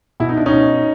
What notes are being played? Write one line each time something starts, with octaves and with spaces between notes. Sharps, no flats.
B2 E4
D#4
D4
C#4 D#4
B2